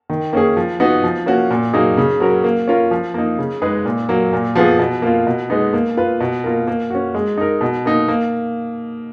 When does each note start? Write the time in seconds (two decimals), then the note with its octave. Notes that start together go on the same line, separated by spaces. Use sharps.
0.10 D#3
0.33 A#3 C#4 G#4
0.57 F3
0.80 B3 D#4 F#4
1.04 F3
1.26 A#3 C#4 F#4
1.51 A#2
1.73 F#3 A#3 D#4 G#4
1.97 C#3
2.20 F#3 C#4 F#4 A#4
2.44 A#3
2.68 C#4 F4 A#4
2.91 F3
3.14 A#3 D#4
3.39 C#3
3.62 G#3 D#4 G#4 B4
3.85 A#2
4.09 F#3 A#3
4.33 A#2
4.55 F3 B3 F4 G#4
4.79 B2
5.02 A#3 F4
5.27 B2
5.50 G#3 B3 D#4
5.73 A#3
5.97 F4 B4
6.20 B2
6.44 A#3 F4 A#4
6.67 A#3
6.90 C#4 F#4
7.15 G#3
7.38 D#4 A#4
7.61 B2
7.85 A#3 D#4
8.08 A#3